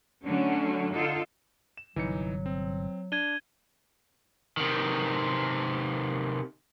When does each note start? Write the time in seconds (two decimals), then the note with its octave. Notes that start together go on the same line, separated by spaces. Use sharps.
0.24 D3 F#3 A3 C#4
0.92 D3 D#4 F4 A4
1.77 E7
1.96 G1 C3 E3 F#3 D#4 C#7
2.46 C4
3.12 D4 G#6 D#7 G7
4.57 C3 D#3